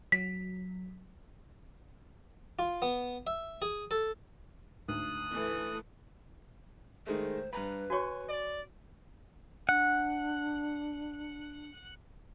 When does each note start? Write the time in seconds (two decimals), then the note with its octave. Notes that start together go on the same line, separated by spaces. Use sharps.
0.12 F#3 B6
2.59 F4
2.82 B3
3.27 E5
3.62 G#4
3.91 A4
4.89 D2 G#2 D#6 F#6
5.30 E3 A3 A4
7.07 D#3 G#3 A3 C5
7.53 G2 B4 A#5 B5
7.90 F#4 C#5 G#5 C6 C#6
8.29 D5
9.69 D4 F#5